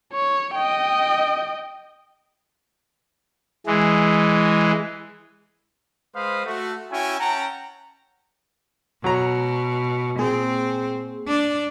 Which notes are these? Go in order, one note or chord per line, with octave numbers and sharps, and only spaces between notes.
C#5
D#5 G5
E3 G#3
G#3 B4 C5 F5 B5 D#6
A3 F#4
C#4 E4 F#4 E5 G5 G#5
C#4 F#5 G5 A5 A#5
B2 F#3 A#5
A#2 C4 G#4
D4